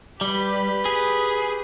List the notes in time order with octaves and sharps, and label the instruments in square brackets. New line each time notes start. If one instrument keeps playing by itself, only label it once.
[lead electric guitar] G3 [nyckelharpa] G4 B4
[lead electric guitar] G#4